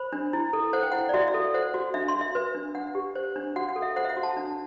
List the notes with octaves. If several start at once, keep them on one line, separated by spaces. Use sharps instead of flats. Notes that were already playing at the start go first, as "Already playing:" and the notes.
Already playing: C5 B5
D4
E4
A4
C5 F#5
G5
E4 F#5
D5
F#4 E5
E5
A4
C5 F#5
F#4
D4 E5
C6
F#4
E5
B4
D4
D4 F#5
G4
C5
D4
F#4 F#5
F#5
A4
E5
C5 F#5
E5
F#5
F#4
A5
D4